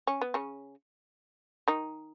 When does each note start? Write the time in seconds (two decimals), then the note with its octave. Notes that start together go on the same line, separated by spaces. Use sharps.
0.07 C#4
0.21 B3
0.34 C#3 C#4
1.68 D#3 D#4